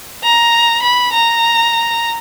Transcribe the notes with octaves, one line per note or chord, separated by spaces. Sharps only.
A#5
B5
A#5